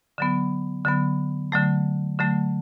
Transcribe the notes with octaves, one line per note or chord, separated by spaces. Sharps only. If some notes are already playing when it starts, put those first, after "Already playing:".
D3 F#3 B3
D3 F#3 B3
D3 F#3 A3
D3 F#3 A3